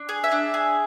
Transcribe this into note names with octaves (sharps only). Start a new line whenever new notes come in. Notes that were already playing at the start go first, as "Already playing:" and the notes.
Already playing: D4
G#4
E5
D4
G#4